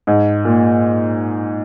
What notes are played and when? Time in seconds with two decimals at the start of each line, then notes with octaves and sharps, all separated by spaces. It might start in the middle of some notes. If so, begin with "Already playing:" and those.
0.07 G#2
0.45 A#2